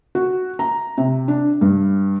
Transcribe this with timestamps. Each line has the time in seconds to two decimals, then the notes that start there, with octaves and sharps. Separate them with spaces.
0.15 F#4
0.59 A#5
0.98 C3
1.28 D4
1.61 G2